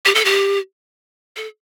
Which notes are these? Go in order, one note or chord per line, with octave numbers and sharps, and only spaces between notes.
G4
A4
G4
A4